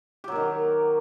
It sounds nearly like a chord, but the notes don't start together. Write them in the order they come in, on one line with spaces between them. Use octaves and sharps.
G4 F#3 A#3 D#3